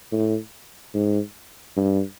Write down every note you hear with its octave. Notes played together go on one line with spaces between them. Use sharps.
A2
G#2
G2